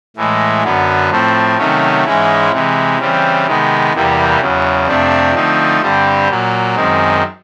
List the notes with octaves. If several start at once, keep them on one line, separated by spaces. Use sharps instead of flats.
A2 E3 G#3
F#2 D3 F#3 B3
A2 F3 A3 C4
C3 D#3 F#3 A3 C#4
G#2 E3 G#3 C#4 E4
C3 E3 G#3
C#3 E3 G3 C4
C3 D#3 G#3 B3
E2 C3 E3 G3 A#3
E2 C#3 F#3
F2 C3 F3 A3 D4
D3 F3 A3 C4 D#4
G2 D3 G3 C4
A#2 F#3 A#3
F#2 D#3 G#3 C4